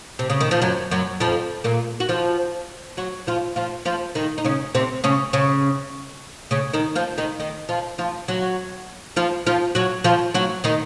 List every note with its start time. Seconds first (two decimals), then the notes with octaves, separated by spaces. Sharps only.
0.19 C3
0.30 C#3
0.40 D#3
0.51 F3
0.62 F#2 F#3
0.91 F#2 F#3
1.20 F2 F3
1.64 A#2 A#3
2.00 F#4
2.09 F3 F4
2.97 F#3 F#4
3.27 F3 F4
3.56 F3 F4
3.85 F3 F4
4.15 D#3 D#4
4.38 D#4
4.45 C#3 C#4
4.75 C3 C4
5.04 C#3 C#4
5.33 C#3 C#4
6.51 C#3 C#4
6.73 D#3 D#4
6.96 F3 F4
7.18 D#3 D#4
7.40 D#3 D#4
7.69 F3 F4
7.98 F3 F4
8.28 F#3 F#4
9.16 F3 F4
9.46 F3 F4
9.75 F#3 F#4
10.04 F3 F4
10.34 F#3 F#4
10.64 D#3 D#4